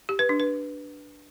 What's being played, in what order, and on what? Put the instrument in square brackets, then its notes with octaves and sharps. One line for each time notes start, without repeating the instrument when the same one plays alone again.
[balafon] G4
B4
D4
B4